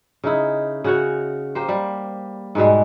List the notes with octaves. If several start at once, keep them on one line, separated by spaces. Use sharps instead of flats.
C#3 D#4 E4
C#3 F#4 C#5
A#3 G4 C5
G3
G#2 B2 G3 G#3